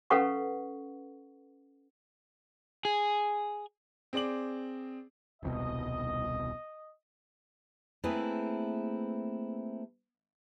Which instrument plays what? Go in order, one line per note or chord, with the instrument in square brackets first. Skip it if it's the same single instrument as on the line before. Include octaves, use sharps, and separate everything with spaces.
[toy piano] C#4 A4 B4 F5 F#5 C#6
[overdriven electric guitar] G#4
[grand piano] C4 G#4 D5 D6 F#7
[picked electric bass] D#1 C2 B2 [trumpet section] D#5
[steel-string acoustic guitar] A3 A#3 C4 E4 G#4 B4